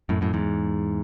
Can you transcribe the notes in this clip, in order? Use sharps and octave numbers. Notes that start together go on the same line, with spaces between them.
F#2 A2
F#2 A2
E2 G#2